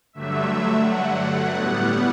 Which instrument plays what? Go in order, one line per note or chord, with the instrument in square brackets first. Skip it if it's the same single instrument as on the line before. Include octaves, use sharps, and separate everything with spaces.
[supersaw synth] G2 D3 F#3 A3 E5
F#5
A2 G3 B3